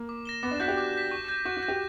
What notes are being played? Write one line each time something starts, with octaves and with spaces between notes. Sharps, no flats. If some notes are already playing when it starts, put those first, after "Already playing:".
Already playing: A#3
D6
A#6 E7 G7
B3 D6
D4
F#4 G6 B6
G4
D6
G6 B6
C#6
G6 A#6
F#4 C#6
F#4
G6 A#6
G4